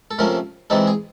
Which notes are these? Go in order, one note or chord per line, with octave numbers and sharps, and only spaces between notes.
A4
C3 F3 A3 C#4 A#4
C3 E3 G#3 C4 D#4 A4
G#4